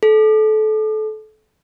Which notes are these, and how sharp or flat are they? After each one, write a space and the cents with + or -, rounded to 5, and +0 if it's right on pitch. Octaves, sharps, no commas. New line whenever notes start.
A4 -25